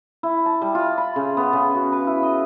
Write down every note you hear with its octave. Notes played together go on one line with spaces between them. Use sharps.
E4
A5
G3
F4
B5
C#3
B3
C#3
F#4
B4
E4
D#5